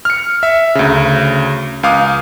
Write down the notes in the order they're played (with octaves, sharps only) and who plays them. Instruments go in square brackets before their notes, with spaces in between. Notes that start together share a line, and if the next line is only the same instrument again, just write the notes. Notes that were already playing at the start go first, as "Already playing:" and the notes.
[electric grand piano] F6 C#7
E5
D2 C#3
C#2 F5 D6 D#6